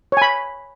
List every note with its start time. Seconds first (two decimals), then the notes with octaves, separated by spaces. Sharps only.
0.12 C#5
0.17 G#5
0.22 B5